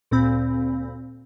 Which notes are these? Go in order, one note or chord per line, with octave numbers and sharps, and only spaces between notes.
D2 A#2 C4 B5